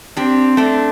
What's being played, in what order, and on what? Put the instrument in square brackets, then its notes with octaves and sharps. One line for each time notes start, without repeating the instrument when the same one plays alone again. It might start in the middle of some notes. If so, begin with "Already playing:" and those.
[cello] C4 [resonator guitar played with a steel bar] D4 G4
[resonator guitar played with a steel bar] A3 D4